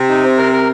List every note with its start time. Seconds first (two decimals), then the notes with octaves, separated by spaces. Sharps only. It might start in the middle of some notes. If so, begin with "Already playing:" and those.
Already playing: C3
0.09 D#4
0.23 C4
0.38 A#4
0.53 A#4